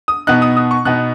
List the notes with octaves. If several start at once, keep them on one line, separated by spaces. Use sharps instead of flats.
D#6
B2 B3 D#4 F#6
D#6
D#6
C#6
B2 B3 D#4 F#6